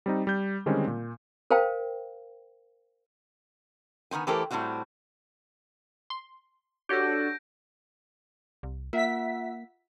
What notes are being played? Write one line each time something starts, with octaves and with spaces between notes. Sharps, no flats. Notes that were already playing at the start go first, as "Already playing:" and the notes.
G3 C4 D#4
G3 G6
D3 D#3 G3 G#3 C4 C#4
A#2
A#4 C5 F5 G5 A5
D#3 B3 C4 G#5
E3 A3 G4 A4 A#4 C5
A2 C3 G3 C4 F#4
C6
D4 F#4 G4 A4 C#5 G6 A#6 D7
C2
A#3 F4 E5 F#5 B6